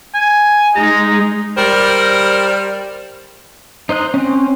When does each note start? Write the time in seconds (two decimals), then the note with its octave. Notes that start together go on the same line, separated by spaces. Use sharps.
0.14 G#5
0.76 G#3 D#4 A#5
1.57 G3 A#4 C5
3.89 D#4 C5 D#5 F#6
4.14 C4 C#4